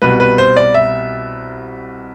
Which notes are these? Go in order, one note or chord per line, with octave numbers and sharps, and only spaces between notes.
C2 B2 G3 B4
B4
C5
D5
E5